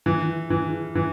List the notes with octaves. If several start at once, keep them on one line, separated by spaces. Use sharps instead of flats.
E3
E3
E3